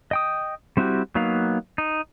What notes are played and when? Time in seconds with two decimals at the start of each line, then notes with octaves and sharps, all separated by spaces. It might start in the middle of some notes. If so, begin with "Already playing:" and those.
0.11 D#5 G5 D#6
0.77 G3 C4 E4 F#4 G4
1.15 F#3 A#3 B3 D#4 F5
1.78 D#4